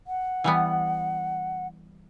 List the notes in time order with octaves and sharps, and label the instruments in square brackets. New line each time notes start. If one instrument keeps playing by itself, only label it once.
[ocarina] F#5
[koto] E3 G3 B3